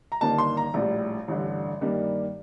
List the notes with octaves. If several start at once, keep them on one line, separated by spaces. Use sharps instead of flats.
A#5
G1 G2 D#3 A#3 A5
C6
A#5
A#1 A2 G3
A1 G2 D3
G2 D#3 G3 A#3